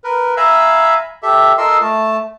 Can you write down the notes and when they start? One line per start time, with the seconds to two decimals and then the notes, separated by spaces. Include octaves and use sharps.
0.04 A#4 B4
0.37 E5 F5 G#5 A#5 B5 E6
1.23 G4 A4 E5
1.58 F4 A4 A#4 D#5 C6 E6
1.81 A3 A5